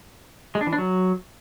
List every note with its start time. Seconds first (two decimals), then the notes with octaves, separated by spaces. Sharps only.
0.55 G#3
0.61 D4
0.67 E3
0.73 D4
0.78 F#3